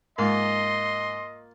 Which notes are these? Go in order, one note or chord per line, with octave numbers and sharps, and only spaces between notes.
G#2 A#3 F4 D#5 C6